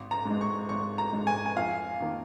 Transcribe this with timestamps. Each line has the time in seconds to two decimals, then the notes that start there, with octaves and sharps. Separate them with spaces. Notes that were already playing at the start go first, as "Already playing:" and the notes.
Already playing: G#1
0.11 A#5
0.25 G#2 G#3
0.41 C#6
0.69 G#1 C#6
0.98 A#5
1.13 G#2 G#3
1.27 G#5
1.46 G#5
1.56 F2 F5
2.00 D#3 A#3